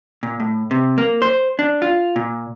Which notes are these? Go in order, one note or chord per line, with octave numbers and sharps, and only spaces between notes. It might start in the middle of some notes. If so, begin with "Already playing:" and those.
A#2
A2
C3
A#3
C5
D4
F4
A#2